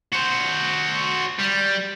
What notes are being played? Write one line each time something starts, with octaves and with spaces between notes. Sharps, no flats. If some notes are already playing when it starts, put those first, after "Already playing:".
F#4 C5
G3